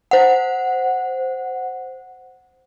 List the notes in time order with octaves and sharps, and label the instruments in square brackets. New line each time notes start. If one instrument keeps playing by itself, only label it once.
[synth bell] C5 F#5